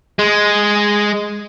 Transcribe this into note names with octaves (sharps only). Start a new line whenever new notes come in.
G#3